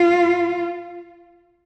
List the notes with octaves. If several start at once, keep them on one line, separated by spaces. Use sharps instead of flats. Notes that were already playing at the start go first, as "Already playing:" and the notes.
Already playing: F4